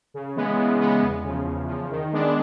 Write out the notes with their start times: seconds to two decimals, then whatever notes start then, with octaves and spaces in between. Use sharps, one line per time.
0.14 C#3
0.36 E3 G#3 B3
0.59 C#3
0.81 E3 G#3 B3
1.03 E2
1.24 C#3 F3
1.46 E2
1.68 C#3 F3
1.91 D#3
2.13 G#3 B3 D4